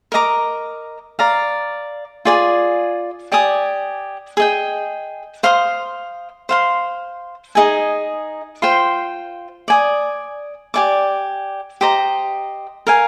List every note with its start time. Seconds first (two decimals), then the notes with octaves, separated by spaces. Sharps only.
0.12 A#4 D#5 A#5 D6
1.19 D5 F5 A#5
2.25 F4 G#4 D5 G#5
3.32 G4 D5 G#5 D#6
4.37 G#4 D#5 G5
5.43 C5 F5 C6 D#6
6.49 C5 F5 C6
7.55 D#4 G#4 D#5 G#5
8.62 F4 C5 G5 C6
9.68 D5 G#5 D#6
10.74 G4 D5 G#5 D6
11.81 G4 C5 D#5 A#5
12.87 A#4 F5 G#5